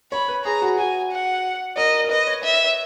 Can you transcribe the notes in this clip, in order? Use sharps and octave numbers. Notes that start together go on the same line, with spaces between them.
C#5 B5
B4
G#4 A#5
F#4
F#4 G#5
F#5
A#4 D#5
A#4
B4 D#5
C#5
E5